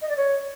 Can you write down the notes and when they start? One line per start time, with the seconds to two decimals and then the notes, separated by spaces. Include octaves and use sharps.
0.01 D#5
0.08 D5
0.16 C#5